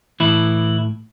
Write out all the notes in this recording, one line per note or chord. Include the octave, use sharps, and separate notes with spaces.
A2 E3 E4